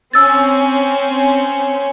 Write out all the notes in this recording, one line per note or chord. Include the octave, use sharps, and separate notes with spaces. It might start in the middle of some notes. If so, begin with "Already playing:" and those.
C4 C#4 E6 A6